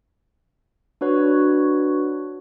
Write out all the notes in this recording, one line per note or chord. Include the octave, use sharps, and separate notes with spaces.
D4 F#4 B4 C#5